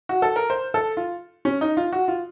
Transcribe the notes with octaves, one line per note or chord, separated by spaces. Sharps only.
F#4
A4
A#4
C5
A4
F4
C#4
D#4
F4
F#4
F4